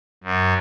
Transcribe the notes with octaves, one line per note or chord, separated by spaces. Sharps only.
F#2